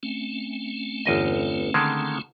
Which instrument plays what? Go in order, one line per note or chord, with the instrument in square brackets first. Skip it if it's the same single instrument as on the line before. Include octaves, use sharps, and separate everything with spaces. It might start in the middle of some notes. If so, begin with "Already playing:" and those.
[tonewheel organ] A3 C4 C#4
[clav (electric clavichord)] G1 E2 D#5
D3 D#3 G#3